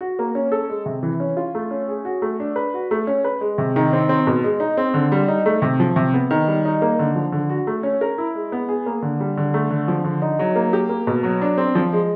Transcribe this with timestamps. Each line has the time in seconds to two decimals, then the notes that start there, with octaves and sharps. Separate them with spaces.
0.01 F#4
0.19 A#3
0.35 C#4
0.52 A4
0.70 G#3
0.86 C3
1.03 E3
1.20 C#4
1.37 F4
1.55 A3
1.71 C#4
1.89 G#4
2.05 F#4
2.22 A3
2.40 D4
2.56 B4
2.74 F#4
2.91 A3
3.07 C#4
3.24 B4
3.41 G#3
3.58 C3
3.76 D#3
3.93 C4
4.09 C4
4.27 B2
4.44 G#3
4.60 D#4
4.77 C4
4.94 D3
5.12 G3
5.28 D#4
5.46 A3
5.62 C3
5.80 F3
5.96 C3
6.14 B3
6.31 D#3
6.48 G3
6.65 D#4
6.82 A#3
6.99 D3
7.15 F3
7.32 D3
7.50 F#4
7.67 A3
7.83 C#4
8.01 A#4
8.18 E4
8.35 G#3
8.52 B3
8.69 G#4
8.86 A#3
9.02 D3
9.20 G3
9.37 D3
9.54 A3
9.70 D3
9.88 F3
10.04 D3
10.22 D#4
10.39 F#3
10.56 A#3
10.73 G4
10.89 A#3
11.07 B2
11.23 F#3
11.41 D4
11.58 C4
11.75 F3
11.92 G#3